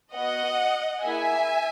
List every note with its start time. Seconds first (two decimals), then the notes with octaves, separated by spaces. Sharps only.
0.14 B3 F#4 D#5 F#5
1.03 A#3 E4 G#4 E5 G#5